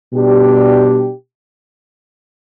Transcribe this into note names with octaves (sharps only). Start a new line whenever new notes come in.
B2 G3 D4 G4